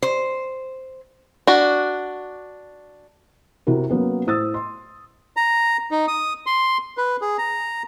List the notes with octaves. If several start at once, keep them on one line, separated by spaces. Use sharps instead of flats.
C5
D4 F#4
C3 E4 F#4 A#4
F#3 A#3 B3 C#4
A2 C5 D#6 E6 A6
C6
A#5
D#4
D#6
C6
B4
G#4
A#5